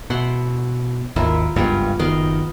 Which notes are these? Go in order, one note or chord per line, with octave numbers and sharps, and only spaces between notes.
B2 E4 F#5 C6
G#1 D#2 E4 F4 A#4
F#1 C#2 G2 B3 F4
F#1 D#3 B3 D#5 F5